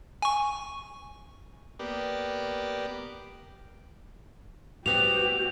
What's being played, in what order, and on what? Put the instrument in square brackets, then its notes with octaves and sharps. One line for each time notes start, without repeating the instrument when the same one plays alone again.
[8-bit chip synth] G#5 C#6
[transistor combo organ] A#3 B3 G4 D5
[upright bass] A2 [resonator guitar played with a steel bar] G3 B3 C4 [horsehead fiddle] F#4 G4 [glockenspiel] F7